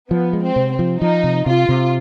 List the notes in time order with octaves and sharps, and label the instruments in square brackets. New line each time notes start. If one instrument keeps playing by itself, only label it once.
[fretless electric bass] F3 [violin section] B3
[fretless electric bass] G#3
[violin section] C4
[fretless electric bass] C3
[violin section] C4
[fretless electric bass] F3
[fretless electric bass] F3 [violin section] D#4
[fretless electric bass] C3
[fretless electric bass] C3 [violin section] F4
[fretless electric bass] C3